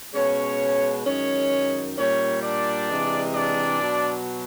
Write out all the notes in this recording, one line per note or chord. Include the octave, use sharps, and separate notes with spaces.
B2 G#3 C#4 C#5
F#2 D#3 G#3 C#4 C#5
A#2 G3 C#4 C#5
D4 D5
C3 E3 G#3
D4 D5
B2 F#3